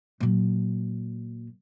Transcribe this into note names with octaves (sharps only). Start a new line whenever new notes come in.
A#2 F#3